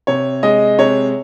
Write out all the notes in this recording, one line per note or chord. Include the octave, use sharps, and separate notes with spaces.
C3 C#5
G#3 D#5
C3 C#5